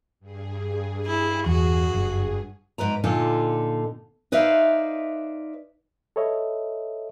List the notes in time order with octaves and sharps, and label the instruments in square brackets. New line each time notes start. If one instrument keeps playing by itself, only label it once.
[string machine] G2 G#4
[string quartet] E4
[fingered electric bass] E2 [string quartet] F#4
[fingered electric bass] F#1
[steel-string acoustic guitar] G#2 B4 D5 A#5
A#2 D3 D#4 F4 A4
D#4 B4 C5 D5 E5 F5
[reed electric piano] A4 B4 C#5 D#5 E5